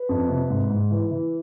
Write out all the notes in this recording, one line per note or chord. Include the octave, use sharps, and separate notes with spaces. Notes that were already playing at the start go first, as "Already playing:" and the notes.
Already playing: B4
F2
C3
G#2
G#2
E3
E3